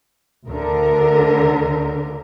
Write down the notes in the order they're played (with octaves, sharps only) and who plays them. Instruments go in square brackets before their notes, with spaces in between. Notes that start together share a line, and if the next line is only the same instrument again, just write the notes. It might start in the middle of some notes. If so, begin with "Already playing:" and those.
[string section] D2 D3 A#4